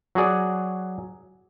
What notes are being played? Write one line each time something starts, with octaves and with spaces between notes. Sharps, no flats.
F#3 F#4 G#4 D5